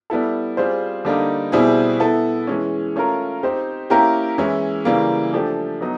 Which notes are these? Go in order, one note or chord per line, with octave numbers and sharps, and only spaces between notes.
G3 B3 E4 A4
G3 C4 F4 G#4 C5
D3 G3 A#3 D#4
B2 G3 C4 E4 G#4
B3 E4 A4
E3 G#3 C#4
A3 C#4 F4 A#4
C4 D#4 G4 C5
A#3 C#4 E4 G4 A#4
E3 G#3 C#4 E4
C#3 E3 G3 A#3
F3 A3 D4 G4
F#3 B3 D#4